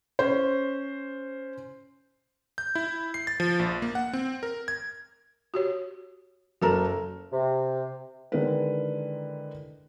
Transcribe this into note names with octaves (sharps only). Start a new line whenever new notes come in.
C#4 C5
G6
E4
C7
A6
F3
A#1
A#3
F#5
C4
A#4
G#6
F#4 G4 C#5
F#1 F#4 A4 A#4
C3
D3 D#3 G#3 E4 A#4 B4